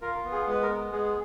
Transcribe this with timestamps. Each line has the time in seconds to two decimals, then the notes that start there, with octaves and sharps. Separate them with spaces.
0.02 F4 A#4
0.25 B3
0.32 G#4
0.47 G#3 B4
0.62 A#4
0.70 B3
0.92 G#3 G#4